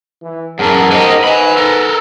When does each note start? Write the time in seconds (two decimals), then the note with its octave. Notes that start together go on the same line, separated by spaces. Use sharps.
0.23 E3
0.59 F#2 E3 C#4 G#4 A#4 F#5 A5 F6
0.91 G#2 D#4 G4 A#4 C5 D#5 F#5
1.24 D#4 B4 G#5 B5
1.57 A4 A#4